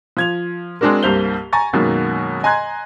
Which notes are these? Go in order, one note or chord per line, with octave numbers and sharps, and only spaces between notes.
F3 G#6 F7
G#3 C4 D4 F#4 A#4
C2 G2 A#3 C5 F7 G7
G#5 A#5 C#6 A6
F#2 B2 D#3 G#3 A#3
D#5 G#5 A#5 C6 F#6 G#6